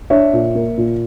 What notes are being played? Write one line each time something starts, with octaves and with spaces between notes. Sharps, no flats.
D4 C#5 E5
A#2
A#3
A#2